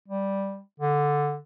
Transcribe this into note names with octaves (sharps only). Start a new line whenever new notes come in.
G3
D3